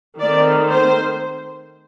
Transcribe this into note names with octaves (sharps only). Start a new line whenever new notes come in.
D#3 A3 C4 D5
C5